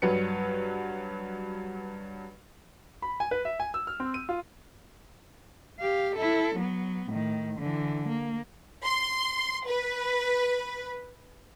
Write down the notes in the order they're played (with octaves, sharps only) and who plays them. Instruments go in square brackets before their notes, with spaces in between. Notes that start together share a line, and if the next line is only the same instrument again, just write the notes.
[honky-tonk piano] G2 F#3 B4 C#7
[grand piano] B5
G#5
B4
E5
G#5
E6
F6
C4
D#7
F4
[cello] G4 F5
E4 A4
F#3 B3
A2 D#3
D3 E3
A#3
[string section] C6
B4